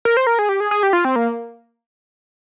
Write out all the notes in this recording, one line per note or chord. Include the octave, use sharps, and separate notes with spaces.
A#4
C5
A#4
G#4
G4
G#4
G#4
G4
F4
C4
A#3